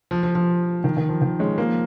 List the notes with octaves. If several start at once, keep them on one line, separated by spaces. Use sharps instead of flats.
F3
F3
F3
D#3
D#3
F3
D#3
G#3 C#4
F3 A#3